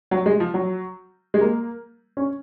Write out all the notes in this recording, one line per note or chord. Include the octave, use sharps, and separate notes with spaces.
F#3
G#3
F3
F#3
G#3
A#3
C#4